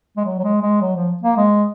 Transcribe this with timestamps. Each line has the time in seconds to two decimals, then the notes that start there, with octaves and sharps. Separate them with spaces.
0.16 G#3
0.25 F#3
0.39 F#3
0.44 G#3
0.62 G#3
0.81 F#3
0.96 F3
1.23 A#3
1.37 G#3